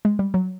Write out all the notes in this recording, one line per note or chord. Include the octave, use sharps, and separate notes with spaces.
G#3
G3
F#3